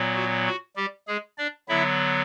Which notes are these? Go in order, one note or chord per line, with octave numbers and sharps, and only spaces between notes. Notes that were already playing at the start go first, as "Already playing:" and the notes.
Already playing: A#2 F#3 B3
F#4
F#4
G3 G4
G#3 G#4
D4 D5
D3 F#3 B3 E4 E5